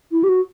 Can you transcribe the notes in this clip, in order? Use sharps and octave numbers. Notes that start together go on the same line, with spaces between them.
E4
G4
F#4